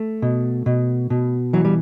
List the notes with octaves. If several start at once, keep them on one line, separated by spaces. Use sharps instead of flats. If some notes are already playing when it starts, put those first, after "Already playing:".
Already playing: A3
B2
B2
B2
E3 F#3
G3